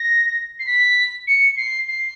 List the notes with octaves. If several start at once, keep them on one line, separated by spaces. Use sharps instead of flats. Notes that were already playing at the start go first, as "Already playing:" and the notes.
Already playing: A#6
C7
B6
C#7
C7
C7